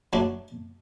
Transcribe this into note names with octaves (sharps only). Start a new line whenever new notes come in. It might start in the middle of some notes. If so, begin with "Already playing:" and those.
F#3 A3 D4 F#4 B4